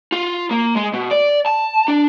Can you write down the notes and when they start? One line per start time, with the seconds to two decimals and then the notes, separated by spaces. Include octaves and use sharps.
0.12 F4
0.51 A#3
0.76 G#3
0.94 B2
1.11 D5
1.46 A5
1.88 D4